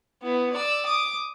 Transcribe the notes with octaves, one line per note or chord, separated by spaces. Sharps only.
B3 E4
D5 E6
D6 D#6